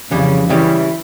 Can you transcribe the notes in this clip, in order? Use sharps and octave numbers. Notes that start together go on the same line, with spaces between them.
F2 C#3 E3 G3
C#3 E3 G3 C#4